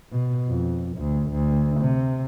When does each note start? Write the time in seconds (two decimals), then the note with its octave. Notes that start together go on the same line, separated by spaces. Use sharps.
0.12 B2
0.48 F2
0.97 D2
1.31 D2
1.81 C3